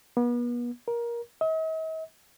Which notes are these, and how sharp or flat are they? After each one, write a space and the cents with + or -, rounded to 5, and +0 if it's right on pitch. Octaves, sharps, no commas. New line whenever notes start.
B3 -35
A#4 +20
D#5 +45